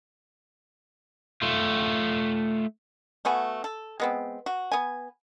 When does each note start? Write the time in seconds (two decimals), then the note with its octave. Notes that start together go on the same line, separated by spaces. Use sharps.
1.42 A3 F4
3.25 A3 B3 F#4 G#5
3.64 A4
4.00 G#3 B3 C4
4.46 F#4
4.72 B3 G#5